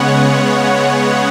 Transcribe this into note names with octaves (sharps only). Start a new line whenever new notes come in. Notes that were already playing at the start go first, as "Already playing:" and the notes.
Already playing: C#3 G#3 B3 C#5 F#5